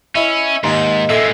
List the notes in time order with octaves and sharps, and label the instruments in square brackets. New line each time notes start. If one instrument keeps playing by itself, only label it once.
[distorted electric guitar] C#4 [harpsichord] E4 [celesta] D#5
[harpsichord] D#2 [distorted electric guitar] G#2 [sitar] D#4 [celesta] C6
[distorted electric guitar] A#2 G#3 [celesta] A4 [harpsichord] E5